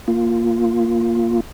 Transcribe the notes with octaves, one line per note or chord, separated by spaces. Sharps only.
A#3 F4